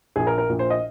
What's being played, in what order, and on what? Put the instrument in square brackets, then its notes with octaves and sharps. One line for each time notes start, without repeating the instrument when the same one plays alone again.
[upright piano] A#1 A#2 G#4
A#4
A#4
A#1 A#2
C5
D#5